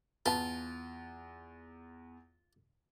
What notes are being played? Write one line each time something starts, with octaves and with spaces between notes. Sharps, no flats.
E2 F4 B4 A5